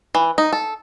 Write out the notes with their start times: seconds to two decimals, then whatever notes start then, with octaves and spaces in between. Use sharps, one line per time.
0.15 E3
0.38 D#4
0.53 A4